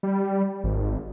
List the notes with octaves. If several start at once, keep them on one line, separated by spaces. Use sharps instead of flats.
G3
G#1